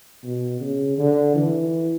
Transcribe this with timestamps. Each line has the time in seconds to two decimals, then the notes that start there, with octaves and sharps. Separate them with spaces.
0.24 B2
0.60 C#3
0.98 D3
1.35 E3